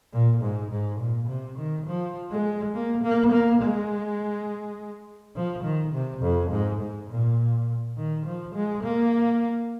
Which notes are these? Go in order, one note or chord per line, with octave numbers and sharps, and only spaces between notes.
A#2
G#2
G#2
A#2
C3
D#3
F3
G#3
A#3
A#3
A#3
G#3
F3
D#3
C3
F2
G#2
G#2
A#2
D#3
F3
G#3
A#3